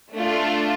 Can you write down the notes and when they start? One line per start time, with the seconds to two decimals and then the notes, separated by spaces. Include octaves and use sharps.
0.15 A3 D4 F4